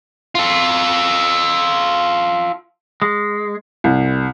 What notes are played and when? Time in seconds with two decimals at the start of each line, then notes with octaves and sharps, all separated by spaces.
0.35 F4 A4
3.02 G#3
3.84 C2